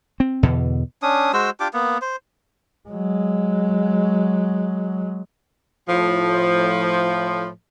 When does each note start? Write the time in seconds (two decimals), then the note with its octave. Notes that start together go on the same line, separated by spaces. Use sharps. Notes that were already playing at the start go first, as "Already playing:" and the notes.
0.20 C4
0.43 E2 B2 D3
1.02 C#4 D4 D#6
1.33 G#3 F#4 C5 E6
1.60 D4 F4 G4 D6
1.73 A#3 B3
2.02 C5
2.89 F#3 G#3
5.88 A2 F3